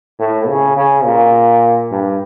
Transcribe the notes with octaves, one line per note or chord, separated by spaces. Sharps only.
A2
C#3
C#3
A#2
G2